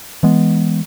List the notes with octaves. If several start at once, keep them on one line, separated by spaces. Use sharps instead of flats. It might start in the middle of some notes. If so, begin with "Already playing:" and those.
E3 G#3 B3